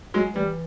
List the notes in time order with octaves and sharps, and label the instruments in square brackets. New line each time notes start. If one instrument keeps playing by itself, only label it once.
[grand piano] F#3 G#3
[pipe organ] E3 [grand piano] G3